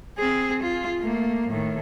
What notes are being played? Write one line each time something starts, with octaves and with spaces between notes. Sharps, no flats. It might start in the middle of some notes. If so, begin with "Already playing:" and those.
C4 G#4
F4
A3 A#3
A2 D#3